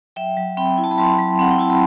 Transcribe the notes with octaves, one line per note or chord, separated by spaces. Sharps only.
F#3 E5 G5
F#3
C4 G5 B5
E4
A5
B5
F#3 A5 C6
F#3
C4 F#5
G5
E4 A5
B5